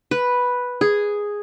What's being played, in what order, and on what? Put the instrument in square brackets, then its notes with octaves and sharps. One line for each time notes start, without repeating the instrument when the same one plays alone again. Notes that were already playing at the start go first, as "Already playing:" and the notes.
[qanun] B4
G#4